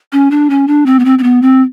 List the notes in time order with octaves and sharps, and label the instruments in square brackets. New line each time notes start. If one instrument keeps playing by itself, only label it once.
[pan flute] C#4
D4
C#4
D4
C4
B3
C4
C4
B3
C4